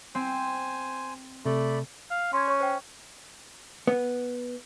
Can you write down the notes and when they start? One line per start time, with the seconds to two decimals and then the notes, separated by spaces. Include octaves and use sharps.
0.15 C4 C5 G#5
1.46 C3 A3 D5 B5
2.11 F5
2.33 C#4 C6 G#6
2.48 C#5 C#6
2.60 C5 G5
3.87 B3